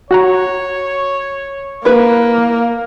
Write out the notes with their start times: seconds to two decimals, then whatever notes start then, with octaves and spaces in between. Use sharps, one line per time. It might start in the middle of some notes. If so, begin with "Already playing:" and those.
0.11 F#4 C#5 F#5 A#5
1.85 A#3 E4 B4